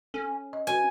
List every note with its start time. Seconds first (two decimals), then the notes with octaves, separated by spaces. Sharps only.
0.14 C#4 A4
0.53 D#5
0.67 F#4 B4 G#5